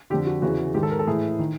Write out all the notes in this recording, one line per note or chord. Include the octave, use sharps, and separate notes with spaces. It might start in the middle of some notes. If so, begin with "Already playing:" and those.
F2 D3 G4
F#4
E2 C#3 E3 F#4
G#2 D#3 G4
A4
A#4
A4
A2 E3 G#4
D#3